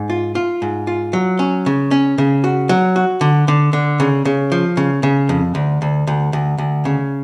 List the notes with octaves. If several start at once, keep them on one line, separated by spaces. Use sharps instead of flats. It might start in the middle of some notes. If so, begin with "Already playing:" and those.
Already playing: G#2
F4
F4
G#2
F4
F#3
C#4
C#3
C#4
C#3
F#4
F#3
F#4
D3
D3
D3
C#3
C#3
F3
C#3
C#3
F2
D2
D2
D2
D2
D2
C#3